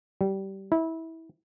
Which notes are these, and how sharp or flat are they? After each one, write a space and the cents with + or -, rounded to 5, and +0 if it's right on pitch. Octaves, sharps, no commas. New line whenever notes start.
G3 -20
E4 -20